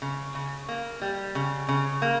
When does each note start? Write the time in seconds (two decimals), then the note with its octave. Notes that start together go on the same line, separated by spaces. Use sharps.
0.02 C#3
0.35 C#3
0.68 A#3
1.02 G3
1.35 C#3
1.68 C#3
2.02 A#3